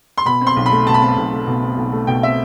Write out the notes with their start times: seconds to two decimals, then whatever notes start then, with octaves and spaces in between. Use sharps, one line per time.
0.18 C6
0.25 B2 B5
0.41 C4
0.47 C6
0.56 B1
0.66 B5
0.72 A3
0.87 B2 A5
0.94 B5
1.01 C4 A5
1.17 B1
1.32 A3
1.47 B2
1.63 C4
1.77 B1
1.92 A3
2.07 B2 G5
2.23 C4 E5